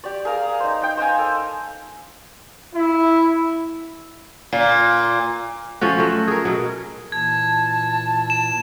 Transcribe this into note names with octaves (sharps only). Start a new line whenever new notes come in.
G4 D5
G#4 A#4 F5 A#5
D#4 C5
D#4 G5
C5 D#5 F5 G#5
A4
E4
A#2
F3 A3 C#4 F#4
F#3 A3
G#4 A#4
B2 F#3
A#2 E3 A5 G#6
E7